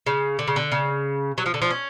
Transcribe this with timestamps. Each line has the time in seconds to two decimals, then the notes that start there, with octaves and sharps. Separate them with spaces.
0.06 C#3
0.39 D3
0.48 C#3
0.56 D3
0.72 C#3
1.38 F#3
1.46 F3
1.54 D3
1.62 F3
1.70 C#4